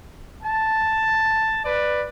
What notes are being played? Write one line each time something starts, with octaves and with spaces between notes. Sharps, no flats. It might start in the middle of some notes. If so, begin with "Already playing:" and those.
A5
B4 D5